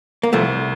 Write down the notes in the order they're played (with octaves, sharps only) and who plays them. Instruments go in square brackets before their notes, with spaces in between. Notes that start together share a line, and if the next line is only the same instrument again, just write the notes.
[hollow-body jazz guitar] A#3
[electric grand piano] C2 [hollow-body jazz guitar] F3 A3